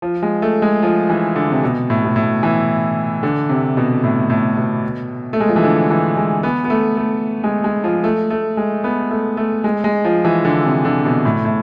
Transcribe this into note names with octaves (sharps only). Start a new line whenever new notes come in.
F3
G#3
A3
G#3
F3
E3
D3
C3
B2
A2
B2
A2
E3
D3
C3
B2
A2
A2
B2
A3
G#3
F3
E3
D3
E3
G#3
B3
B3
A3
A3
G#3
G#3
F3
A3
A3
G#3
B3
A3
A3
G#3
G#3
F3
E3
D3
C3
D3
B2
A2
A2